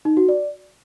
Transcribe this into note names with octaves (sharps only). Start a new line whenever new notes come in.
D#4
F#4
D5